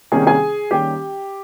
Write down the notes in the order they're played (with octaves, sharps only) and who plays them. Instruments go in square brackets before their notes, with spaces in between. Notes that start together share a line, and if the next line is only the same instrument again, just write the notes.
[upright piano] C3 D#3 G3 A#3 C#4 G#4 G#5
G#4 G#5
D#3 G3 A#3 C#4 G4 G5